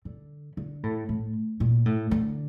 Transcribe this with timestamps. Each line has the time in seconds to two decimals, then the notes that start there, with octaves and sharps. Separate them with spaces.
0.05 D3
0.57 D3
0.83 A2
1.09 A2
1.60 A#2
1.86 A2
2.11 D3